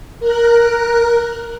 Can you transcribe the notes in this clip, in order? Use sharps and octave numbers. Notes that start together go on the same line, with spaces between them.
A#4 F#6